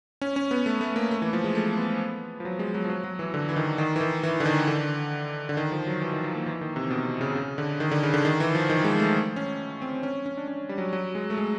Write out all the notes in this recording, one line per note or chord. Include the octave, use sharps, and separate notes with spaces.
C#4
C#4
B3
A3
A3
A#3
A3
E3
F3
G#3
A3
B3
F3
F#3
G#3
F#3
F3
F#3
F#3
E3
D3
E3
D#3
D#3
E3
D#3
E3
D3
D#3
D3
D3
D#3
F3
F#3
E3
D#3
F3
A#3
E3
D#3
C3
B2
C3
C#3
C#3
D3
D#3
D3
C#3
D3
D#3
E3
F3
D#3
G#3
A3
C#4
C4
C#4
C#4
D4
C#4
G3
F#3
F#3
G#3
A3
G#3